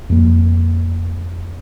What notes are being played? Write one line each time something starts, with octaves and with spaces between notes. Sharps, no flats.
F2 A#3